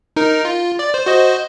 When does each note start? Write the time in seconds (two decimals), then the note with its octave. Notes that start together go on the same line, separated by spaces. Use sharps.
0.16 D#4 A#4
0.45 F4
0.79 D5
0.94 C5
1.06 F#4 C5 D#5